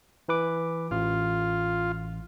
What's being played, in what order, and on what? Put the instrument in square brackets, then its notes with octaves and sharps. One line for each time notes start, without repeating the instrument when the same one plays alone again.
[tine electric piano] E3 B4 D6
[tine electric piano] A1 [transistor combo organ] F4